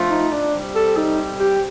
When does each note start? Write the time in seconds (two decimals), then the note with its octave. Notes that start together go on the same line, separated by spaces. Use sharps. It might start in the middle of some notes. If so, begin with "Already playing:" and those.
Already playing: F3 A3 D4 F4
0.11 D#4
0.32 D4
0.54 C3 G3 C4
0.75 A4
0.97 D#4
1.40 G4